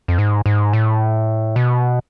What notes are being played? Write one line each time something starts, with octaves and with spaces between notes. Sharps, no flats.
F2
G#2
G#2
A2
B2